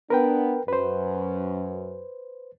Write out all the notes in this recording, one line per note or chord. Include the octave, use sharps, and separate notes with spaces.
B3 D4 A#4 B4 G5
F#2 B4 C5